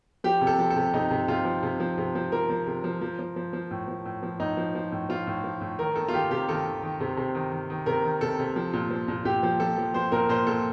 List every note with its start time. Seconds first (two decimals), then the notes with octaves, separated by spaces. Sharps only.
0.24 F3 G4
0.41 C3
0.47 A4
0.58 F3
0.70 A4
0.76 C3
0.94 C3 D#4
1.11 C3
1.28 C3 F4
1.45 F3
1.63 C3
1.80 F3
1.98 C3
2.15 F3
2.32 F3 A#4
2.50 F3
2.67 C3
2.84 F3
3.01 F3
3.19 F3
3.36 F3
3.53 F3
3.71 A2
3.88 F3
4.05 A2
4.23 F3
4.40 A2 D#4
4.57 F3
4.75 F3
4.92 A2
5.09 F3 F4
5.27 A2
5.44 F3
5.61 A2
5.79 D#3 A#4
5.96 D#3 A4
6.08 F4
6.13 D#3 G4
6.30 C3 G4
6.48 D#3 A4
6.65 D#3
6.83 D#3
7.00 C3
7.17 C3
7.35 D#3
7.52 D#3
7.70 D#3
7.86 C3 A#4
8.04 D#3
8.21 C3 A4
8.39 C3
8.56 F3
8.73 A#2
8.91 F3
9.08 A#2
9.25 A#2 G4
9.43 F3
9.60 F3 A4
9.78 F3
9.94 F3 C5
10.12 A#2 A#4
10.29 A#2 C5
10.47 A#2 A4